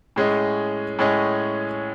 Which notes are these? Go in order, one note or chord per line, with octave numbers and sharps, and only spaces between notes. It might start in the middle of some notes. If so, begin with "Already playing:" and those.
A2 G#3 C#4 G#4 D#5
A2 G#3 C#4 G#4 D#5